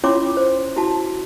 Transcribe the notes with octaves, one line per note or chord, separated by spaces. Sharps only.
C#4 E4 F4 C#5 C6 D6
C5
E4 F#4 A5